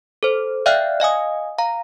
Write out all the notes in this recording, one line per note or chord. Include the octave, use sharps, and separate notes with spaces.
A4 C5
D5 E5 F5 G5 F6 F#6
D#5 F5 G#5 D#6
F5 A#5